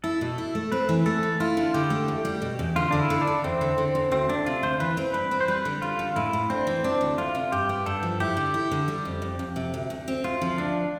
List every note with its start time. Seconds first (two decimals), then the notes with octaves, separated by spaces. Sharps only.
0.04 E4 A4
0.21 B2
0.38 E4
0.55 A3
0.72 C4 B4
0.89 E3
1.06 A3 A4
1.23 E3
1.40 E4 F4
1.57 D3
1.74 D3 G4
1.90 A3
2.08 E2
2.25 G3
2.42 B2
2.59 E2
2.76 D3 F4
2.91 D3 D4
2.99 E4
3.10 D3
3.21 D4
3.27 D3
3.44 E2 C4
3.61 D3
3.78 D3
3.95 E2
4.11 D2 C4
4.29 D2 D4
4.46 C3 F4
4.63 D2 C5
4.80 E3 B4
4.97 C4
5.14 G2 B4
5.31 C4
5.40 C5
5.48 G3 B4
5.65 D3
5.82 G3 F4
5.99 D3
6.16 A2 E4
6.33 A2
6.50 C4 D4
6.67 E3
6.84 C4 D4
7.01 D2
7.18 D2 F4
7.35 C3
7.52 G2 G4
7.69 B3
7.86 G2 A4
8.03 F3
8.20 E4 G4
8.37 D3
8.54 E4
8.71 D3
8.88 G3
9.05 F2
9.22 F2
9.39 F2
9.56 C3
9.74 D2
9.90 D2
10.08 C4
10.24 D2 F4
10.41 F3
10.58 D2 D4